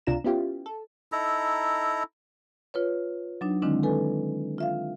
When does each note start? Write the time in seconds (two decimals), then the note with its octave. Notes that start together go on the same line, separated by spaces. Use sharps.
0.07 C#2 C3 D4 F4 A#5 E7
0.24 B3 C#4 E4 F4 G4
0.66 A4
1.12 D#4 E4 A4 A#5
2.74 F4 B4 C#5
3.41 F#3 D4 D#4
3.62 D3 D#3 G#3 C4 D4 E4
3.83 A4 B4 G#5
4.58 F4 E5 F5